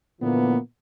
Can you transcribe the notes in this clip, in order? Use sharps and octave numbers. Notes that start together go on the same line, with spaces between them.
A#2 D3 E3 F3 A#3 B3